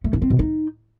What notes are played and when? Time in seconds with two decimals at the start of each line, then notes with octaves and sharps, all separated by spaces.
0.04 A3
0.13 D4
0.22 C4
0.30 B2
0.39 D#4